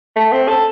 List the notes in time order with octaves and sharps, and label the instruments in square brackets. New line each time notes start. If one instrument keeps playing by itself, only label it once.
[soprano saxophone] A3
C4
A4